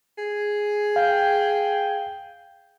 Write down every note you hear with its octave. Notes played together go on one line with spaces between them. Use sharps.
G#4
F5 G5